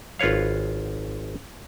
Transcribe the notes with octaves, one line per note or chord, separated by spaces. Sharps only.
G#1 F4 B4 C#5 F5